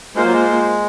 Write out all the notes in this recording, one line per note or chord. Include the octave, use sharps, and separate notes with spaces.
G#3 A#3 F4 C5
F#3
G#3